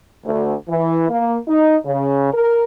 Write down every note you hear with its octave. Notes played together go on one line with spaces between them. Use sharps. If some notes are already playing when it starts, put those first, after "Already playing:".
D2
E3
A#3
D#4
C#3
A#4